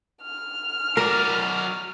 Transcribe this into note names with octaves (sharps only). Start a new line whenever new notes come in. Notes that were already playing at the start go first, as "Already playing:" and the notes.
F6
F#3 A#4 D5